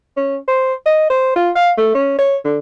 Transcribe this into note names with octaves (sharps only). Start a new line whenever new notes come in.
C#4
C5
D#5
C5
F4
F5
A3
C#4
C#5
D3